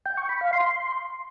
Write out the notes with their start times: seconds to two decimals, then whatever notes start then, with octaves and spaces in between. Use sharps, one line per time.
0.06 G5
0.17 C#6
0.29 B5
0.41 F5
0.53 C6